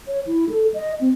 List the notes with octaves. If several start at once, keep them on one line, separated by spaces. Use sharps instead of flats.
C#5
E4
A4
D#5
C4